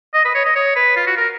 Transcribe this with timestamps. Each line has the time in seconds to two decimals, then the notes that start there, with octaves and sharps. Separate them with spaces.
0.14 D#5
0.25 B4
0.35 C#5
0.45 D#5
0.56 C#5
0.76 B4
0.96 F4
1.07 F#4
1.17 A#4